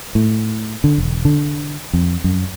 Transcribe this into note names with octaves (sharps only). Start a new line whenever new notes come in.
A2
D3
E1
D3
F2
F#2